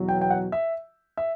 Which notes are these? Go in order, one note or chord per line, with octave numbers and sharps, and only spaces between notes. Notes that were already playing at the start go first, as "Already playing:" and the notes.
Already playing: E2 B2 F#3
G5
G5
F#5
E5
E5